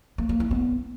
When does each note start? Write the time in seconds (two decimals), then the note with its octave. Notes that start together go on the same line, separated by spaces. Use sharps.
0.18 A#3
0.29 A#3
0.40 E4
0.51 B3